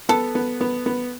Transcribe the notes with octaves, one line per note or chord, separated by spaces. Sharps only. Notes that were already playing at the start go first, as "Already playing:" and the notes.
B3 A4
B3
B3
B3